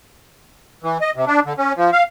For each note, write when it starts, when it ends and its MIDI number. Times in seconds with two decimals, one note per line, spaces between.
0.83 0.98 52
1.01 1.11 75
1.16 1.25 48
1.27 1.40 62
1.45 1.53 50
1.58 1.73 61
1.77 1.90 53
1.93 2.03 77